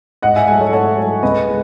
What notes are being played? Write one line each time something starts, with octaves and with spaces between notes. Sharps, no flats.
G#2 D#5 F#5
E5 G#5
F#3 A3 E5 G#5
A4 C#5
G#2 A4 C#5
F#3 A3
C#2 B4 D#5
G#3